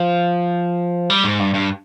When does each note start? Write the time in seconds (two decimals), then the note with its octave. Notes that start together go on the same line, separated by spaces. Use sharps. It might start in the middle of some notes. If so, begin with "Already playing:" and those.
Already playing: F3
1.10 G3
1.24 G#2
1.40 G2
1.54 G2